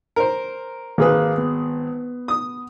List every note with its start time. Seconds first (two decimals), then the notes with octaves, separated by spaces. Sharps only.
0.16 A#4 C5
0.98 G#1 A#3 G#4 B4
1.38 B3
2.28 D#6